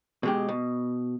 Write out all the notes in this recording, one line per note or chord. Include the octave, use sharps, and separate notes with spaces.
B2 G#3 G4
B2